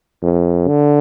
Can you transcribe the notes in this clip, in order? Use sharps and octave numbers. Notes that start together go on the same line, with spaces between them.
F2
D3